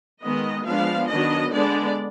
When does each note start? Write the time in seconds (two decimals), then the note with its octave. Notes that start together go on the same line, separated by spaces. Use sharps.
0.22 D#3 G#3 B3 D#5
0.65 F3 G#3 B3 D4 F5
1.08 D#3 F#3 B3 D4 D#5
1.51 D3 G#3 B3 D4 D5